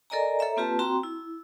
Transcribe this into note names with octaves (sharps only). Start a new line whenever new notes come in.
A4 A#4 D5 D#5 G#5 A#5
A4 C#5 E5 A#5
A#3 C4 F4 G4 B4 A5
C4 F#4 G5 A#5 C6
E4